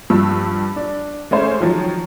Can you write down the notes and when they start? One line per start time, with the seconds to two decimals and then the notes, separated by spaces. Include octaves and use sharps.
0.10 G2 F3 E6
0.76 D4
1.31 G#3 A3 C#4 C5
1.60 D#3 F3 F#3